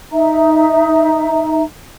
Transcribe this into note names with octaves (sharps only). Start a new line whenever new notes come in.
D#4 E5 A#5